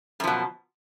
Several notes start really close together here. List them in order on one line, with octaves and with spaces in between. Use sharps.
F#2 F3 B2